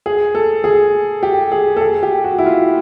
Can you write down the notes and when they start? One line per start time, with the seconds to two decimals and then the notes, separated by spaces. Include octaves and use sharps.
0.06 G#4
0.35 A4
0.64 G#4
1.23 G4
1.52 G#4
1.76 A4
1.81 G#4
2.03 G4
2.24 F#4
2.38 E4
2.46 F4